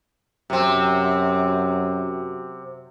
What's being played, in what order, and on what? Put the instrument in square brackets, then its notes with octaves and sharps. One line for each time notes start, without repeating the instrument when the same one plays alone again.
[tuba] F#2 [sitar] C3 C4